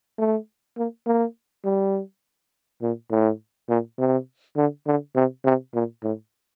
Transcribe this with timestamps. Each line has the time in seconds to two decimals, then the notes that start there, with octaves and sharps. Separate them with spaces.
0.19 A3
0.77 A#3
1.07 A#3
1.65 G3
2.82 A#2
3.11 A2
3.69 A#2
3.99 C3
4.57 D3
4.87 D3
5.16 C3
5.45 C3
5.74 A#2
6.03 A2